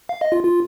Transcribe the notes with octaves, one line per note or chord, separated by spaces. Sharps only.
F5
D#5
F4
F4